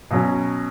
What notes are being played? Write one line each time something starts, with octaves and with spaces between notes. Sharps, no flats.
B2 F#3 C#4